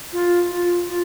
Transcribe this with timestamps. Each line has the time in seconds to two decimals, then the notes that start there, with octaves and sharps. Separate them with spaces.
0.13 F4
0.51 F4
0.89 F4